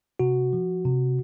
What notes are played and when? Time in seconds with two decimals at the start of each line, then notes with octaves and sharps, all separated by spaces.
0.20 C3 F#4
0.53 F3
0.85 C3